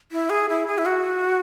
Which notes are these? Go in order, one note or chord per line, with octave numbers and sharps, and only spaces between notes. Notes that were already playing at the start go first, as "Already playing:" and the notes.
E4
G#4
E4
G#4
E4
F#4